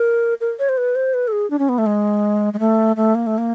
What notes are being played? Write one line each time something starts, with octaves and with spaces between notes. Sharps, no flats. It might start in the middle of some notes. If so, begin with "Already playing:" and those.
Already playing: A#4
A#4
C#5
C5
B4
C5
B4
A4
G#4
D4
C#4
B3
A3
G#3
G#3
A3
A3
A#3
A3
A#3